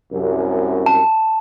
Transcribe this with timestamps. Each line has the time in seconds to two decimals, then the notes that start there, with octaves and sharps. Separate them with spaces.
0.13 C2 F#2
0.86 A5